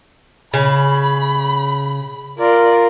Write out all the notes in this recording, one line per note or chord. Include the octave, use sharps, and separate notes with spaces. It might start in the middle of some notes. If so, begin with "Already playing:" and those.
C#3 B5
F4 A#4 D5